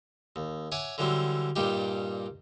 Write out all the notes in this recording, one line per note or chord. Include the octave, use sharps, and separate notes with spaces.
D#2
C#5 E5 F#5 G#5 D6
D3 E3 F#3 G3 C4
G2 A#2 G3 D4 D#4 G4